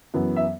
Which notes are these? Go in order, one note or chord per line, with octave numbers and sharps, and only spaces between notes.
F#2 E3 B3
E5